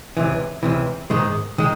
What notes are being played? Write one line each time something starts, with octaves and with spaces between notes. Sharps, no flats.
C#2 C3 E3
C#2 C3 E3
G#2 D#3 G#3
D#3 G#3